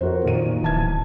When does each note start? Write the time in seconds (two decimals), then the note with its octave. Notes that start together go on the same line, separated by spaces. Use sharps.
0.01 F2 F#4 A#4 C5
0.25 A#2 D#3 D#7
0.63 D1 E3 A5 G#6